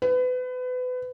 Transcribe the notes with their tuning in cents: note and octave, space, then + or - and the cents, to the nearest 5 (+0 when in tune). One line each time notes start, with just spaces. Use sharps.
B4 +30